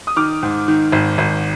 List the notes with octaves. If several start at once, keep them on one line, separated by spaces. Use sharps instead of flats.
D#6
D#3 D6 F6
G#2
D#3
G#1
G#1